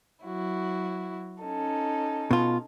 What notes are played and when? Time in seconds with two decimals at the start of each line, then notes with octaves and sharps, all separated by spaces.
0.24 F#3 E4 F#4
1.41 C#4 D#4 A4
2.31 B2 F4